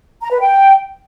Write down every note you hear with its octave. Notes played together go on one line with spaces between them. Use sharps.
A#5
B4
G5